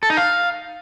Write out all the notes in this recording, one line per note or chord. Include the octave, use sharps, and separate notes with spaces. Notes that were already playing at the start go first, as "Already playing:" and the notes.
A4
D#4
F5